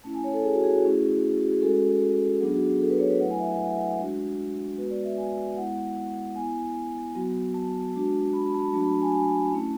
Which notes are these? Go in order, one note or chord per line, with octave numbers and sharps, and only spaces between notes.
A3 C#4 E4 A5
G#5
C#5
A4
G#4
F#4
G#4
F#4
A3 C#4 E4 G#4
F#4
G#4
G#3 C#4 F#4 A4
F#3 B3 D4 G#4
F#4
G#4
A4
B4
C#5
B4
F#3 A3 E4 F#5
G#5
E5
E5
F#5
E5
F#5
G#3 D4 F#4
G#3 B3 F#4 B4
D5
E5
G#5
G#3 B3 E4 F#5
B3 E4 G#5
F#3 B3 F#4
A5
G#3 D4 F#4
B5
B5
A5
B5
F#3 A3 D4 F#4 A5
B5
A5
G#5
G#5
A3 C#4 E4 A5